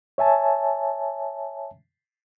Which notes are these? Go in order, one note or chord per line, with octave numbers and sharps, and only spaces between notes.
C#5 E5 G#5 A5